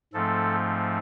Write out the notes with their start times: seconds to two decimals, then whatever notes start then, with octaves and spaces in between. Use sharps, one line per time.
0.13 G#2 F3 A3 C4 A4